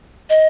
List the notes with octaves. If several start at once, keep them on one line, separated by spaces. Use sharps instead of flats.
D#5